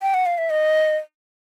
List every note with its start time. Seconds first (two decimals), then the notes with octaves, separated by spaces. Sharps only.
0.02 G5
0.14 F#5
0.26 F5
0.38 E5
0.50 D#5